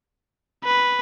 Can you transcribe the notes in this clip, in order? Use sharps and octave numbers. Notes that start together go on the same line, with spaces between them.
B4